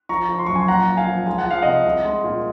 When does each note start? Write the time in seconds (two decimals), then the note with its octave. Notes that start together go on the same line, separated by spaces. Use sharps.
0.09 F3 A#5 C#6
0.29 F3
0.39 C6
0.46 F#2 C#6
0.55 G#5 C6
0.68 A#2 F#5 A#5
0.87 A#2
0.97 F5 G#5
1.07 F3
1.27 G#3 G#5
1.38 F#5
1.46 F3 F5
1.62 C3 D#5 F#5
1.85 C2
2.05 G#3
2.24 A#2